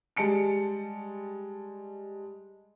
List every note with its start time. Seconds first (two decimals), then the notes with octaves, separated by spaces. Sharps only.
0.17 G3 G#3 A5 C#7 D7